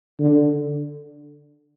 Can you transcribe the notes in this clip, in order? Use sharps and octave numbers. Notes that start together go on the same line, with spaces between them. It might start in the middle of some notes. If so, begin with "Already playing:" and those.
D3